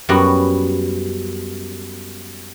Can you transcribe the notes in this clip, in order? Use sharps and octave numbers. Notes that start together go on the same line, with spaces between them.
F#2 G3 B3 F#4